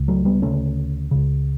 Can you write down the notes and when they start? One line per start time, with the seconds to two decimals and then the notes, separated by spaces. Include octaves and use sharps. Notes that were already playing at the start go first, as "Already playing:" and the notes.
Already playing: C#2 C#3
0.08 F#3 A3
0.25 G3 B3
0.42 D2 C#3 A3 C#4
1.11 C#2 C#3